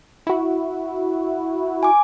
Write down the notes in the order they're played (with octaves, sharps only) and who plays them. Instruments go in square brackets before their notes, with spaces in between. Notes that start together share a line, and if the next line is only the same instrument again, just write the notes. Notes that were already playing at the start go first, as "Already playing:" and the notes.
[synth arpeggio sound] E4 F#4
[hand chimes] G#5 D6